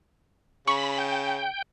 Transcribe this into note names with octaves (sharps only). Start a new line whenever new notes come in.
C#3 B5 C#6
G5